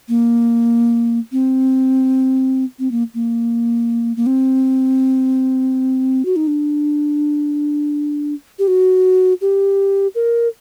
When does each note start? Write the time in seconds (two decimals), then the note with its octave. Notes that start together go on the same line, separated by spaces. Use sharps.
0.09 A#3
1.32 C4
2.79 C4
2.91 A#3
3.15 A#3
4.17 A#3
4.26 C4
6.25 F#4
6.36 D#4
6.47 D4
8.59 G4
8.68 F#4
9.41 G4
10.15 A#4